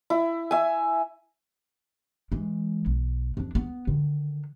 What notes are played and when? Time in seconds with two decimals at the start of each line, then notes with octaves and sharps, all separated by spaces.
0.10 E4
0.51 E5 G#5
2.32 E3 G#3
2.86 B1
3.37 F2 D4
3.55 B3
3.87 D3 D#3